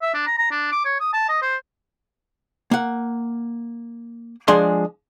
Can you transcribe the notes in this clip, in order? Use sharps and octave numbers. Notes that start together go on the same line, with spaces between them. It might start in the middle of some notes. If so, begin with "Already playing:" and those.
E5
D4
A#5
A#5
D4
D6
C#5
D#6
A5
D#5
C5
A#3 F#5
F3 G#3 D4 G#4 C6